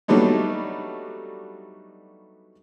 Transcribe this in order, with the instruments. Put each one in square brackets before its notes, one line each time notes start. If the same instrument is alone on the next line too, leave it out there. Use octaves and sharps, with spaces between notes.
[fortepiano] F#3 G3 A3 B3 D4 D#4